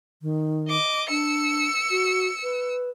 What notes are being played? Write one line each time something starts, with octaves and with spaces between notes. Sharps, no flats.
D#3
D#5 D6
D4 E6 C#7
F#4
B4